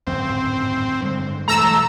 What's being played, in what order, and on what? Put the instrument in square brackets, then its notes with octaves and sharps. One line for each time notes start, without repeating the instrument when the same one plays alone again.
[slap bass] D1 G#1 F#2 [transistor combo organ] C4
[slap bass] G2 D3 G#3
[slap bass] E1 E3 [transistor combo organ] A3 [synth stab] A#5 E6